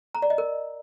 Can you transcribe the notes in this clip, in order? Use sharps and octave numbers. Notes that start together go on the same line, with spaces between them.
A#5
D5
D#5
A#4